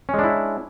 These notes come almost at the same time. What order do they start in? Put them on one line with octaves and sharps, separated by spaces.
C#4 G#3 D4 E4